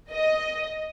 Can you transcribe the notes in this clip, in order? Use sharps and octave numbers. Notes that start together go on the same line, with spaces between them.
D#5